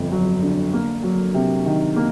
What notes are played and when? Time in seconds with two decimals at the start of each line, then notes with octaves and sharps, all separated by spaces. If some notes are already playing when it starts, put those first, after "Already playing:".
Already playing: G1 F2
0.12 F#3
0.42 D3
0.73 A#3
1.03 F#3
1.34 C3
1.66 D#3
1.96 A#3